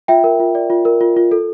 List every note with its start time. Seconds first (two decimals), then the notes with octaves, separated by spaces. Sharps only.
0.08 F4 E5 G5
0.24 A#4
0.40 F4
0.55 D5
0.70 F4
0.85 A#4
1.01 F4
1.17 F4
1.32 A4